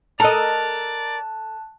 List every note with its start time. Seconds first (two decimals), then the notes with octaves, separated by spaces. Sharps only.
0.20 A4 A#4 D5 D#5 A5 A#5 F#6